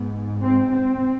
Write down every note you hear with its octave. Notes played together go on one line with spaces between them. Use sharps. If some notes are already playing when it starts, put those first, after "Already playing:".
Already playing: G#2 B3
C4
C4